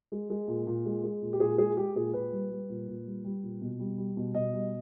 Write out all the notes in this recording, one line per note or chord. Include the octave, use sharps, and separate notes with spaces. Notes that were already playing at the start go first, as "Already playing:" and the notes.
G#3
G#3
A#2
A#2
G#3
G#3
A#2
G4
A#2 G#4
G#3 G#4
G#3 G4
A#2 G#4
A#2 B4
G3
G3
A#2
A#2
G3
G3
A#2
B2
G3
G3
B2
B2 D#5
G3